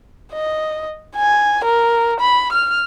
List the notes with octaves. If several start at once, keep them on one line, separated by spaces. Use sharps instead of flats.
D#5
G#5
A#4
B5
F6